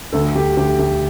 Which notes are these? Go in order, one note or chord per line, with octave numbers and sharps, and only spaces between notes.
D2 A4
D2 G4
D2 G4
D2 G4